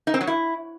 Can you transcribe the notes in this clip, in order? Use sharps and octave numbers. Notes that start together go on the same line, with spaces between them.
D#4
C4
F#3
E4